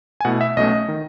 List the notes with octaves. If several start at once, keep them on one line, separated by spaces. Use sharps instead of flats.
G#5
B2 A3 E4 F#5
E5
B1 B2 A3 C#4 D#5
D#3